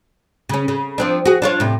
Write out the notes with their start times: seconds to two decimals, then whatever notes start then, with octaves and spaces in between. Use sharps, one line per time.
0.49 C#3 C#4
0.68 C#3
0.98 F3 C4 D4
1.25 F#4 G#4
1.42 D4 F4 C#5
1.60 A2 C3